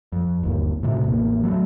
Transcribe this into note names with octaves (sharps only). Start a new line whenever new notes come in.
F2
G1 D#2
A2 C3
A1 E2 A#3
F#3 A3